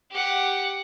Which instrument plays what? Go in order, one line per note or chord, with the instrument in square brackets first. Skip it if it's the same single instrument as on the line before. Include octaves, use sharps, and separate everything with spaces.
[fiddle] G4 F#5